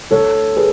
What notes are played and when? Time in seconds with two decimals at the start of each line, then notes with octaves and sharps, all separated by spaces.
0.11 D2 D3 A4 C#5
0.56 G#4 B4